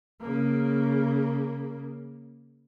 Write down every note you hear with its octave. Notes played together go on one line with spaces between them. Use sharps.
C#3 A#3